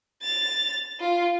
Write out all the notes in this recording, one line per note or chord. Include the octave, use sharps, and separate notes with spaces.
A6 F7
F4